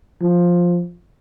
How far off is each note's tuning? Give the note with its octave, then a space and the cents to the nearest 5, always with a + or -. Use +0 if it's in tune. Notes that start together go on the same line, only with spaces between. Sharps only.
F3 +5